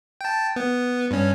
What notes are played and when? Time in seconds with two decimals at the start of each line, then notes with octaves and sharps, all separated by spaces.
0.21 G5 A5
0.56 B3
1.11 G2 C#4